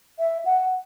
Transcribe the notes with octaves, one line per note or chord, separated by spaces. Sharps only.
E5
F#5